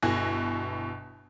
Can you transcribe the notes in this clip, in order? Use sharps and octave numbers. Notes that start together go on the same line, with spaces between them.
G1 B2 E4 G#5 F#6 A#6